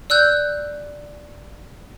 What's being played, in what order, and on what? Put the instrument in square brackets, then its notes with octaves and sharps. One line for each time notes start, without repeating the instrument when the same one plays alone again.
[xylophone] D5 E6 F#6 G6